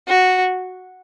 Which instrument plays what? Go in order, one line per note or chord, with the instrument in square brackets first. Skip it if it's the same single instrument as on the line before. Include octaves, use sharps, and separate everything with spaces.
[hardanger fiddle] F#4